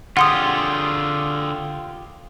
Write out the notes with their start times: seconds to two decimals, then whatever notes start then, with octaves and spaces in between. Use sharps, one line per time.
0.17 D3 F4 G4 G#4 F#5 C6 D#6